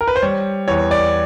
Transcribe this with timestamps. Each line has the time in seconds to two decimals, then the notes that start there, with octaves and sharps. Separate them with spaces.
0.01 A#4
0.08 B4
0.16 C5
0.22 G3 C#5
0.68 E2 C#5
0.91 D5